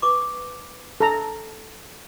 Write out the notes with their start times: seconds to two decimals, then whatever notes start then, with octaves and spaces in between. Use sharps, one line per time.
0.02 B4 C#6 D6
1.00 A4 A#5